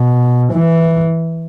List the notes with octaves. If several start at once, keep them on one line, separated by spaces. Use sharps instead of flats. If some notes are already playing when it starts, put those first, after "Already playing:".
Already playing: B2
E3